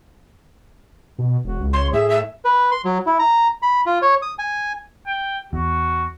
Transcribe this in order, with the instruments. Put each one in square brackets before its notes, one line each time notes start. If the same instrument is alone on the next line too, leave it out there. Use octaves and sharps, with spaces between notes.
[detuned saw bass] B2
[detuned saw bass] E1 [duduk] F#4
[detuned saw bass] C#2
[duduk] C#5 [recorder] C6
[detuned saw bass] A2 [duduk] G#4 [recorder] E5
[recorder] E5
[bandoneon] B4
C6
F#3
E4
A#5
B5
F4
C#5
D#6
G#5
[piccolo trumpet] G5
[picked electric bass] E2 [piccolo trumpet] F#4